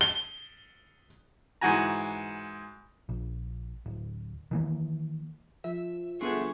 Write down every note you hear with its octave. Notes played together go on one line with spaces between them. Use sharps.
G7
G#2 E3 F#4 G#5 A#5
A#1
D1
D#3 E3 A#3
F3 E5
G1 G#3 A3 B3 G#4 C#6